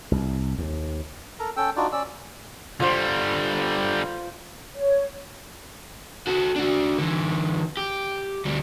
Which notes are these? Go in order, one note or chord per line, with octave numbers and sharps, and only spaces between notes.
C2
D#2
A4 A#4 A#5
C#4 A4 G5 E6
D4 D#4 F4 F#4 D5
C#4 D5 E6
D3 G3 F4 C5
C#5
F#4 A4
D4 F#4
D3 E3
G4
D2 G3